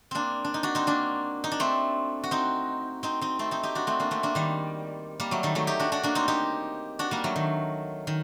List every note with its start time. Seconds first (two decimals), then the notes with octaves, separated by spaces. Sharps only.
0.11 A#3 C4 D4
0.44 D4
0.54 D#4
0.63 D4 F#4
0.75 C4 D#4
0.87 A#3 D4
1.44 D#4
1.52 D4
1.60 A3 C4
2.23 F#4
2.31 C4 D#4
3.03 C4 D#4
3.21 C4 D#4
3.39 A3 C4
3.51 C4 D#4
3.63 D#4 G4
3.75 D4 F#4
3.87 A3 C4
4.00 A#3 D4
4.11 A3 C4
4.23 A#3 D4
4.35 D#3 G3
5.20 G3 A#3
5.31 F#3 A3
5.43 D#3 G3
5.55 F#3 A3
5.67 D#4 G4
5.80 D4 F#4
5.92 D4 F#4
6.03 A#3 D4
6.15 C4 D#4
6.28 D#4 G4
6.99 D4 F#4
7.11 G3 A#3
7.24 F#3 A3
7.36 D#3
8.07 D#3